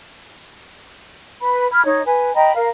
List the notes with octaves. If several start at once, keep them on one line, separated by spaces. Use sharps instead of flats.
B4 B5
B5 F6 G#6
D#4 C#5
B4 G#5
D#5 G5 A#5 B5
A#4 F5